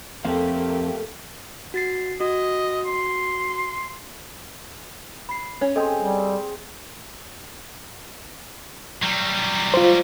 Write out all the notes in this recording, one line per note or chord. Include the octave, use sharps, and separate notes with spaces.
F2 A3 A#3 C4 G4 F5
F#4 A6 C7
F#4 D#5
C6
B5 C7
C#4
C4 G#4 A4 D#5 G5
G3
F#3 G3
F4 C5